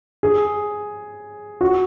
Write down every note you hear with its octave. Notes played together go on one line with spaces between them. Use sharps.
G#4
F#4